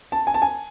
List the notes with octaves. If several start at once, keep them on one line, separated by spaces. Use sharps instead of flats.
A5
G#5
A5
G#5